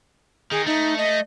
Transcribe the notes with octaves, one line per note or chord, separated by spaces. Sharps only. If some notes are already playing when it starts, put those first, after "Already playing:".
D#3 G#4
A3 D#4
D#5